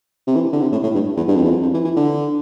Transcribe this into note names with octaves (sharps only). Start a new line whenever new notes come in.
C3
E3
D3
C3
A2
A2
G2
E2
G2
F2
E2
F2
F2
E3
E3
D3